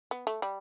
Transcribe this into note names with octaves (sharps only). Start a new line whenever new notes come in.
B3
A3
G3